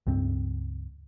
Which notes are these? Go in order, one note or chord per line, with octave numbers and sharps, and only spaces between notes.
C#2 G2 C4